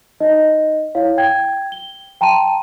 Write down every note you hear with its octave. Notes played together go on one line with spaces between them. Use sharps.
D#4 D#5
E4 C#5 F5
G5 G#6
G7
G5 A5 A#5 C6 D#7